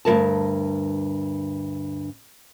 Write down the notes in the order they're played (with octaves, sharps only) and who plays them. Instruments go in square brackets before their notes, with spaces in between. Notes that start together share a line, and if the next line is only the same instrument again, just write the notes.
[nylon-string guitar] D2 G2 D#3 A#4 A5